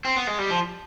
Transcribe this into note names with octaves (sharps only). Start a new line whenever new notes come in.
C4
B3
G#3
G3
F3